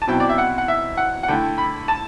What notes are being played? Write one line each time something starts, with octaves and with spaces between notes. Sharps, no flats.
A5
B2 F#3 C4 E4 G5
D5
E5
F#5
F#5
E5
F#5
F#5
D3 A3 E4 G5
B5
A5